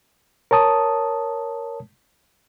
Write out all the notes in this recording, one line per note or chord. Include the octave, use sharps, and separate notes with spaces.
A#4 C#5 A5 D#6